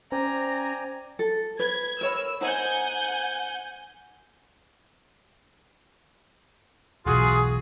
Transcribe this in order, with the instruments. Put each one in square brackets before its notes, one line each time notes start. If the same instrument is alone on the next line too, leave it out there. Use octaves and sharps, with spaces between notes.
[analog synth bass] C#4 [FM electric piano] C5 [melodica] D5 G5 G#5 [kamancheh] A#5
[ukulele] A4
[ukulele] B4 [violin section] G#6
[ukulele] A#4 C#5 B5 [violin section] E6
[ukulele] D#4 C5 A#5 [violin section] F#5 G#5 G6
[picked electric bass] E1 B1 [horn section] F4 F#4 G#4